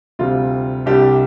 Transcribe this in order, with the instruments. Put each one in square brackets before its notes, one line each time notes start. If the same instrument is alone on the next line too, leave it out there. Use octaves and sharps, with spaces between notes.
[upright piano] D2 C3 G3 C4 F4
C2 C3 G3 D4 G4